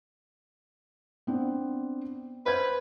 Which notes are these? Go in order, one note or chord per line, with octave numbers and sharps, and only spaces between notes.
B3 C4 D4
B4 C5 G6 G#6